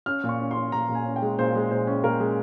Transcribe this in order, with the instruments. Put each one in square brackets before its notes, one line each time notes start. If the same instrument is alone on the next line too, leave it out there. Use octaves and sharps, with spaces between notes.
[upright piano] C#4 F6
A#2
C#6
C#4
C6
C#4
A#2 A#5
A#2
G#5
C#4
G5
G#3
A#2 C5
G#3
A#2 C5
C#4
A#2 A#4
G#3